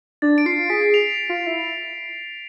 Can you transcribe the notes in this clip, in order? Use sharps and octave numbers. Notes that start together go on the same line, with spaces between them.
D4 A6
D7
F4 C7
G#4 B6
F7
F4
E4